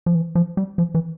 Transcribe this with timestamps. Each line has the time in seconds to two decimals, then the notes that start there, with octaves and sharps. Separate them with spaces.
0.06 F3
0.15 E3
0.35 F3
0.57 G3
0.78 F3
0.95 E3